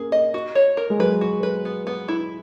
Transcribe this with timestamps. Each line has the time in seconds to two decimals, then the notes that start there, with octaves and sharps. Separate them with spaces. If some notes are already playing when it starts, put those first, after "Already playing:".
Already playing: A#3 C#4 G#4
0.12 D#5
0.34 F#4
0.55 C#5
0.77 A#4
0.90 G#3
0.99 F#3 B4
1.21 F#4
1.43 B4
1.65 B3
1.87 B3
2.08 E4